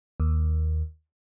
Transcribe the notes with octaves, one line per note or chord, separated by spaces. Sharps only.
D#2